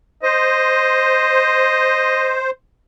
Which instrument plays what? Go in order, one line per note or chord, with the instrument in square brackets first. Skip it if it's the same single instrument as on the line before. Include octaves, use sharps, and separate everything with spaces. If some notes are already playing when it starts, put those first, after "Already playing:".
[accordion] C5 [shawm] D#5